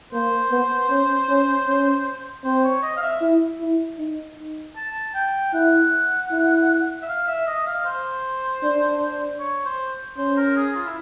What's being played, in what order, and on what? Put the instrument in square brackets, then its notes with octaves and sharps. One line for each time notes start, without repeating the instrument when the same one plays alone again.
[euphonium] A#3 [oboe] C5
[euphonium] B3
C#4
C#4
C#4
[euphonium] C4 [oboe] C5
[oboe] C#5
D#5
F5
E5
[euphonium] E4
E4
D#4
[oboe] A5
G5
[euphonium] E4 [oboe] F#5
[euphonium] E4
[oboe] E5
F5
E5
D#5
F5
C5
[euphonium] D4
[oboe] C#5
C5
[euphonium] C#4 [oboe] C5
[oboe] A#4
G#4
F4
E4